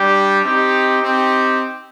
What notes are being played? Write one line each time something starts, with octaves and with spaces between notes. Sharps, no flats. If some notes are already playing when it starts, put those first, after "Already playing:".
Already playing: G3 D4 G4
C4 D#4 G4
C4 D#4 G4